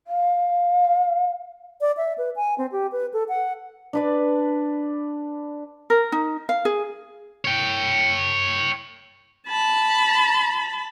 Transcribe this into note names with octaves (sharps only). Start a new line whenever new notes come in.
F5
D5
E5
B4
G#5
C4
G4
B4
A4
F#5
D4 B4 D5
A#4
D#4
F5
G#4
C#5 G5
A5 B5